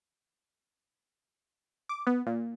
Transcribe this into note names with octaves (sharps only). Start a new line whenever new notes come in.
D6
B3
A#2